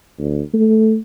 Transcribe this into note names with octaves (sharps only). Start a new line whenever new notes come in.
D2
A3